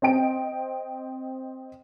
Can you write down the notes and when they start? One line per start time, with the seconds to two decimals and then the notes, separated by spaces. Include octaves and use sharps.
0.02 C4 D#5 G5 D7